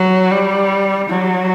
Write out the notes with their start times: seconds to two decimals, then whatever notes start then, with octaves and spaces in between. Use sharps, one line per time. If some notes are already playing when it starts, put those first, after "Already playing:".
Already playing: F#3
0.31 G3
1.10 F#3